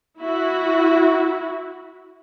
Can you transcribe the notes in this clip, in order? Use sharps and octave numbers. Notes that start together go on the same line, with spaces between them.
E4 F#4